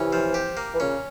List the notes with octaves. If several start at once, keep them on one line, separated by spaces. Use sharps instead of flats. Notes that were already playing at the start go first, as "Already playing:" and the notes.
Already playing: C3 E3 C#4
F3
G4
A#3
E3
A#2 C#3 C#4